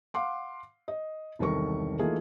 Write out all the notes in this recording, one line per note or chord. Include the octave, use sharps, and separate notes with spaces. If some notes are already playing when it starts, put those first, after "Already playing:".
F5 F#5 C6 D6
D#5
E1 C2 D#3 A4 A#4 C#6
E3 A3 A#3 D#4 F4 G#4